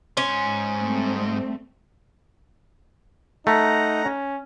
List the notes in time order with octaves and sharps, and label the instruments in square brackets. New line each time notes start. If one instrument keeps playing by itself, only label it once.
[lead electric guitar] G#2 C6 [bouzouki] C#4
[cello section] G3 A3 C4
[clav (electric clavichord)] A3 [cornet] D#4 [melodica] F#5 A#5
[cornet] C#4